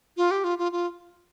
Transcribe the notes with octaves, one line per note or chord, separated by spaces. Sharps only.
F4
G4
F4
F4
F4